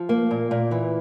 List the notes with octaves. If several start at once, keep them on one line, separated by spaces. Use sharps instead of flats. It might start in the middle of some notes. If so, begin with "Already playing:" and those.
Already playing: F3
A#3
A#2
A#2
E3